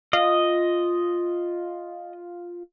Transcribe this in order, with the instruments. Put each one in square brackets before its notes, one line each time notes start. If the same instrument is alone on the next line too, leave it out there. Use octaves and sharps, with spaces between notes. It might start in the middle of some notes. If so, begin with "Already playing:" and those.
[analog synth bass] F4 [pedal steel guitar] D#5